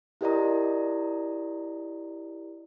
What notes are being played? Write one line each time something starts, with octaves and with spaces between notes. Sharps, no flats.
E4 G4 A#4 D5 D#5 A#5